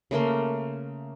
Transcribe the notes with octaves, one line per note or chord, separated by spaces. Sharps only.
C#3 A3 A#3 C6